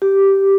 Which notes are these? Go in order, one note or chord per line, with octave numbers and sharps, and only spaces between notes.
G4